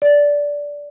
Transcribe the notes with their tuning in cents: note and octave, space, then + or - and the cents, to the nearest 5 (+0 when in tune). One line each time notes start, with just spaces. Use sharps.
D5 -15